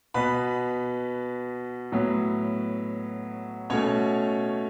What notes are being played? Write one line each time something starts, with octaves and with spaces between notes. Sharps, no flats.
B2 B3 B4 B5
A2 F#3 B3
B2 A3 C#4 C#5